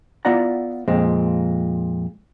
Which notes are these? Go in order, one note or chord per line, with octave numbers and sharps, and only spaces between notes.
B3 E4 F4 D5 F#5 A#5
F2 A#2 G#3 C4